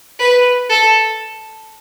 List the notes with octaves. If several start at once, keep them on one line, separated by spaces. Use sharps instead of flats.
B4
A4